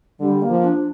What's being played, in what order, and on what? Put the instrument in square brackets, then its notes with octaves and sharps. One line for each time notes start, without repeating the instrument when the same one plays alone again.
[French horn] D3 [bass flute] G3
[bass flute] A#3
[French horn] F3
[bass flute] D4